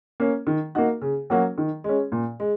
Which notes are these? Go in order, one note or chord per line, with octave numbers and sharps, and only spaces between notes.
A#3 C#4
D#3
A#3 D#4 F#4
C#3
F#3 A#3 C#4 F#4
D#3
G#3 C#4
A#2
G#3